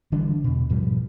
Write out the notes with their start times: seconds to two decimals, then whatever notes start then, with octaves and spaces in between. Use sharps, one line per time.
0.12 D3 E3 G3 D4
0.44 E2 B2
0.70 G#2 B2 F3 G3